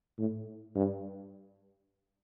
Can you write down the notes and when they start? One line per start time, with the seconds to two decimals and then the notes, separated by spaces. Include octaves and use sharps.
0.19 A2
0.76 G2